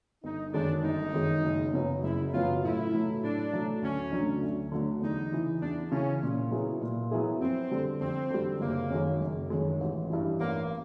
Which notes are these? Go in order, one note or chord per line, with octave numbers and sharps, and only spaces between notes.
G1 D#4
F#2 D#3 G#3 D4
G1 D#4
F#2 D#3 G#3
F#1
F#2 C#3 F#3 B3
F#1 E4
F#2 C#3 F#3 B3 F4
A2 E4
F#3 A3
A2 D4
F#3 A3
D2 C#4
D3 F#3 A3 D4
D2
D3 F#3 A3 D4
E2 D#4
C#3 E3
E2 D4
C#3 E3 C#4
A#2
F#3 B3 E4 G#4
A#2
F#3 B3 E4 G#4
F2 C4
D3 G3
F2 C4
D3 G3
F#1 A#3
F#2 D#3 G#3
F#1
F#2 D#3 G#3
A1
G2 E3
A1 A#3